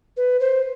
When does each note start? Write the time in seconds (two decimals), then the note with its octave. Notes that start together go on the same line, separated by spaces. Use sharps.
0.17 B4
0.40 C5